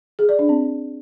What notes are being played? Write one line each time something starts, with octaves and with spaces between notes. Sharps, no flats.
G#4
D5
D4
C4